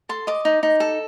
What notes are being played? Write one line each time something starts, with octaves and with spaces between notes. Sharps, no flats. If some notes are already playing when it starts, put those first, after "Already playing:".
A4 C6
D#5 D6
D#4
D#4
A4